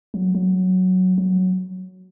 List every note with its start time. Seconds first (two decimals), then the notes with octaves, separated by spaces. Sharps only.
0.14 F#3
0.35 F#3
1.18 F#3